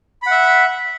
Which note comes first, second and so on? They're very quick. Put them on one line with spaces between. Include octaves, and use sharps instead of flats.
B5 F#5 E5